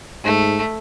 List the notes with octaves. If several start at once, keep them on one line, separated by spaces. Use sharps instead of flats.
G#2 A3